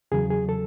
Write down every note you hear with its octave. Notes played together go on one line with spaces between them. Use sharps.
E2 C#3 F#3 G#4
G#4
A4